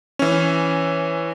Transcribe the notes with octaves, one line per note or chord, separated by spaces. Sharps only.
E3 C#4